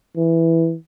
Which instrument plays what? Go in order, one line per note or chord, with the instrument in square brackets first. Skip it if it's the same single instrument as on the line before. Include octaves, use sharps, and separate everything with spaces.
[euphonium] E3